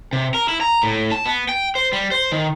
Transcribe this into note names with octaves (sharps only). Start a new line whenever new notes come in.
C3
A#4
E4
A#5
A2
A5
B3
G5
C5
G3
C5
D#3